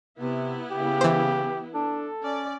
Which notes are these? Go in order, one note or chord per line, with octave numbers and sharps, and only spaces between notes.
C3 B3 E4
C#3 G4
E3 C5
D4 A4
C#4 D5